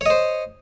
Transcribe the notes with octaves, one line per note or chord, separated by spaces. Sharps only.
C5 C#5 D#5